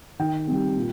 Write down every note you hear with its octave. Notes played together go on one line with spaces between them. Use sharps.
D#3 G5
G3 C4
A#2